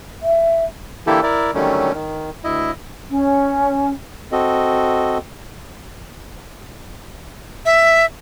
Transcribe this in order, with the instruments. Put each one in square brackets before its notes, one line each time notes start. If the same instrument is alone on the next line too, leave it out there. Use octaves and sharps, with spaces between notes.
[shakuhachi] E5
[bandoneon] D3 E3 A#3 E4 G4 A4
E4 A#4 D5
D3 D#3 F#3 G3 A3 C#4
D#3
D2 E4 D#5
[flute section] C#4
[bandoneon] C4 F#4 A4 D#5
[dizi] E5